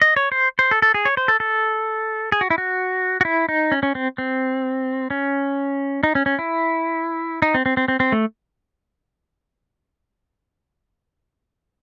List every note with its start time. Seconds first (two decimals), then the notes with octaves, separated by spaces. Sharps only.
0.02 D#5
0.16 C#5
0.32 C5
0.59 C5
0.71 A4
0.82 A4
0.94 G#4
1.05 C#5
1.17 C5
1.28 A4
1.40 A4
2.32 G#4
2.41 F#4
2.50 E4
2.58 F#4
3.21 F#4
3.25 E4
3.49 D#4
3.72 C#4
3.83 C#4
3.95 C4
4.18 C4
5.10 C#4
6.03 D#4
6.15 C#4
6.26 C#4
6.39 E4
7.42 D#4
7.54 C4
7.66 C4
7.77 C4
7.88 C4
8.00 C4
8.12 A3